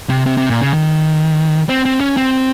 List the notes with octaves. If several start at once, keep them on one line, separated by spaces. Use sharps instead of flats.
C3
C3
C3
A#2
C#3
D#3
C4
C4
C#4
C4